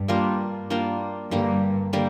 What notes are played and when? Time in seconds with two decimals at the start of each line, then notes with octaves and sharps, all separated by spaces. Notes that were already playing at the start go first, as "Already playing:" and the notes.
Already playing: G2
0.08 G3 A#3 D4 F4
0.70 G3 A#3 D4 F4
1.31 G2 D3 G3 A#3
1.93 D3 G3 A#3